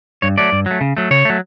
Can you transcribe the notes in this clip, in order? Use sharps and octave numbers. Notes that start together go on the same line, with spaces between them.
G2 C#5
F#3 A3 D5
G2
F#3 A3
C#3
F#3 A3
C#3 C#5
F#3 A3